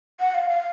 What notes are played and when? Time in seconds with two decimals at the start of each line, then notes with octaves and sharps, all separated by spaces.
0.20 F#5
0.34 F5
0.49 F5